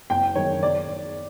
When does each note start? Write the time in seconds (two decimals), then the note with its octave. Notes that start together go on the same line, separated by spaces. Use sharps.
0.10 F#1 G5
0.35 F#2 D#3 C#5
0.63 D5